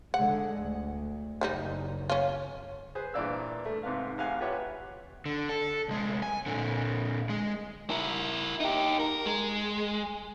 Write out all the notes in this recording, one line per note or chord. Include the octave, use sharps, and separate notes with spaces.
D3 G#3 F#5
D2
F#1 D#3 G3 D#4
C#4 F4
G#4 B4 C5
G2 A#2 E3 D5 F5 E6
A3
G#2 C3 B4 F5
A1 F5 F#5 G#5 F#6
F4 G4 B4 C#5 E5 F#5
D3
A4
C2 G#3
G#5
A#2 D3
G#3 G#4
E4 A#4
D#4 G4
A#4
G#3